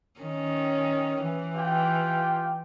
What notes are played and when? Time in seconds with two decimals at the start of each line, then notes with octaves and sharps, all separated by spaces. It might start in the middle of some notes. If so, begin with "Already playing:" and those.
0.20 D#3 C#4
1.23 E3
1.56 F4 G4 G5